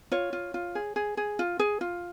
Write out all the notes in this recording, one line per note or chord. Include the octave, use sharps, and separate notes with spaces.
F4 C#5
F4
F4
G#4
G#4
G#4
F4
G#4
F4